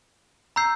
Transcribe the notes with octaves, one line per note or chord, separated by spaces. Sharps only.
A#5 E6 G6 C7